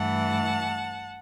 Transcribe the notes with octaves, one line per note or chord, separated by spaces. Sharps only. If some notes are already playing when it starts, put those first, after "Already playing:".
Already playing: G2 E3 A3 F#5 A5